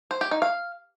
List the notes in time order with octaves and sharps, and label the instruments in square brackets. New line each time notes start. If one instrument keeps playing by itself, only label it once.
[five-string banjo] C5
G4
D#4
F5